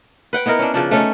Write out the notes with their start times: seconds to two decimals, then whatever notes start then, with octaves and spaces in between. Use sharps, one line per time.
0.33 B4 F#5 G5
0.46 B3 D#4 E4 A#4
0.59 C#4 D4
0.74 C#3 F3 D4
0.91 A3 C#4 D#4